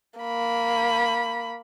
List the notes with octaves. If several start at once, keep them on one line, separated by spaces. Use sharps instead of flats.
A#3 B5